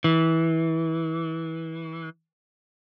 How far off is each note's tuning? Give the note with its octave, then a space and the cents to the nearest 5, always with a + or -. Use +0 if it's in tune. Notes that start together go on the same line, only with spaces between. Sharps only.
E3 -20